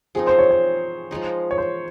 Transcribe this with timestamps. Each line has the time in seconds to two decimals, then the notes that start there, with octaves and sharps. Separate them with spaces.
0.15 F3 C4 D#4 G#4
0.27 C5
0.39 C#5
0.51 C#5
1.11 F3 G#3 D#4
1.51 C#5
1.58 C5